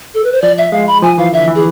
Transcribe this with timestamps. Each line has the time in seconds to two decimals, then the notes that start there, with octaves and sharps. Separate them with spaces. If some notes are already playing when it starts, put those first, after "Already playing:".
0.14 A4
0.24 B4
0.32 C5
0.42 F3 D5
0.58 E5
0.72 G#3 F5
0.87 B5
1.02 F3 G#5
1.18 E3 F5
1.33 D3 E5
1.47 E3
1.55 G#4